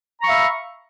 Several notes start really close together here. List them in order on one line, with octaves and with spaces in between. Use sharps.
A#5 C#6 F5 E5 B5